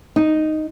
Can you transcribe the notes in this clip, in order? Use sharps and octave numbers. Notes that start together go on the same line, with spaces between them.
D#4